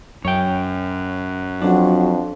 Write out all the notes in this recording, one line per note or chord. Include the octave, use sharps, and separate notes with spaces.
F#2 C#5 G5
F2 F#3 D4